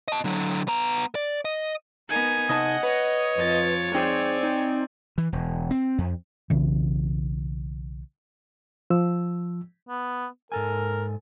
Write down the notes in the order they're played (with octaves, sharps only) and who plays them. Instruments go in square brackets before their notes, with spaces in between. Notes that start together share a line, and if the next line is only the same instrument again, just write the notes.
[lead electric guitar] D#5 A5
D3 F#3
B3 A#5
D5
D#5
[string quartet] B3 D#4 A#4 [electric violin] G#5
[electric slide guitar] C3 D#4 A5 [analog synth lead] D#5 [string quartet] F#5
[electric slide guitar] B4 [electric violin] C#5
[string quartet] F2 F3 A6
[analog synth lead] C4 [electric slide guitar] D#4 G#4 C5 [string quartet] D5 G#5
[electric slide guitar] D#4
[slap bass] E3
E1
C4
F2
[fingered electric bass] B1 C#3 E3
[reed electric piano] F3 E6
[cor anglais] B3
[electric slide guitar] G#2 A4 G#5 [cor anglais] A#4